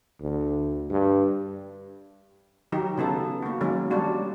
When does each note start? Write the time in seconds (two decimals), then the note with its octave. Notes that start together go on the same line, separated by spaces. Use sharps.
0.21 D2
0.90 G2
2.72 D#3 F#3 D#4 G4
2.98 C#3 B3 D#4 A4
3.43 A#3 F#4
3.61 D#3 F#3 G#3 A#3 C#4
3.90 G3 G#3 D4 F#4